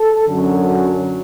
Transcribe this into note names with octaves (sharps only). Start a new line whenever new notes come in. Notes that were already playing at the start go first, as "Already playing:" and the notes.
Already playing: A4
F#2 D3 F#3